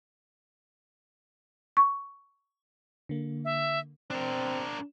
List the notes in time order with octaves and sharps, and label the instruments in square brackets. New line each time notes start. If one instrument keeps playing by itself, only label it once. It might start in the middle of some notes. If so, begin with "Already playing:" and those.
[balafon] C#6
[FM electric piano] D3 A#3
[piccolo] E5
[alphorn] C4 [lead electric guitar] D4 A#4